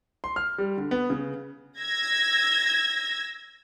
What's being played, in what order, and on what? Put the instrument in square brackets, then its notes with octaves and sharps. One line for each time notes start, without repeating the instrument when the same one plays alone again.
[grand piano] C6
F6
G3
D3
B3
C#3
[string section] E6 G#6 A#6